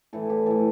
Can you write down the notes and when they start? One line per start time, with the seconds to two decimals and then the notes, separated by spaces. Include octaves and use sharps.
0.13 A2 E3 A4
0.30 G4
0.46 A2 E3 A4